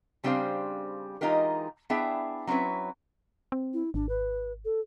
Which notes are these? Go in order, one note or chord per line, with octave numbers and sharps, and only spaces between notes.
C#3 G3 C4 D4 C5 F5
E3 G#3 D#4 F4 G4 A#4
B3 D4 E4 G#4 E5 G5
F#3 C4 C#4 E4 B4
C4
E4
G#1 D4
B4
A4